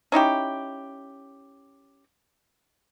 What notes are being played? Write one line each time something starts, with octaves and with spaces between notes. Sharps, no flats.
C#4 D#4 E4 G4